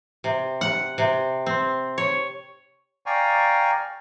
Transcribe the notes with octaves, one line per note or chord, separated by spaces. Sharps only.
C3
F#5
C3
C4
C#5
D5 F5 G5 G#5 A#5 C#6